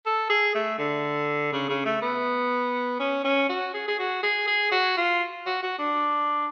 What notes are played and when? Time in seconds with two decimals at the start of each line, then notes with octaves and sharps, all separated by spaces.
0.06 A4
0.30 G#4
0.55 A3
0.79 D3
1.53 C#3
1.69 C#3
1.85 A3
2.02 B3
3.00 C#4
3.24 C#4
3.49 F#4
3.74 G#4
3.88 G#4
3.99 F#4
4.23 G#4
4.47 G#4
4.72 F#4
4.97 F4
5.46 F#4
5.63 F#4
5.78 D4